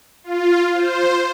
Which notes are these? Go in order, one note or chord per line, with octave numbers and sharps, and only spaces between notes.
F4
C5